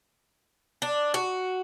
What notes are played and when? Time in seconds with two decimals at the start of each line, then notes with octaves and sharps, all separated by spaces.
0.82 D4
1.14 F#4